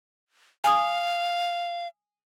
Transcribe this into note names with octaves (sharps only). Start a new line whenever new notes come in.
F5 G#5 D#6